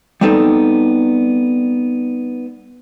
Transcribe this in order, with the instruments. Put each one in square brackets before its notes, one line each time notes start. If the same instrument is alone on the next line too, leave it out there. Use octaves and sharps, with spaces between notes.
[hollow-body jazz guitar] G3 B3 C4 D#4 A4